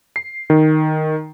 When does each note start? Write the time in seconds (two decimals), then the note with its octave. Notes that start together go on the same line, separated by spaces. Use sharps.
0.16 C7
0.50 D#3